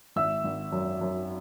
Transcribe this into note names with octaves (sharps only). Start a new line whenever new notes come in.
G#1 E5 E6
G#1
F#2
F#2